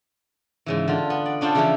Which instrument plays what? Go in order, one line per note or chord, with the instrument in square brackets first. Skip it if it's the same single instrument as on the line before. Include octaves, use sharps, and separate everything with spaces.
[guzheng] G#2 C#3 E3
D3 F4
B3
D5
C#4 D4 F4 A4 C5
C#3 E3 F3 C#4 E4 G4